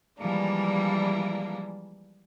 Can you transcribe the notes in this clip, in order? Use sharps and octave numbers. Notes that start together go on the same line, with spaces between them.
E3 F3 G3 G#3 A#3 D4